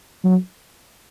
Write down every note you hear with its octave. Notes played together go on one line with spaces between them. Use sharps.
F#3